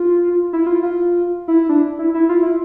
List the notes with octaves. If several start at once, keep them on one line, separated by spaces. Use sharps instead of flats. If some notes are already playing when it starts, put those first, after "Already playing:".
Already playing: F4
E4
F4
F4
E4
D4
E4
E4
F4
E4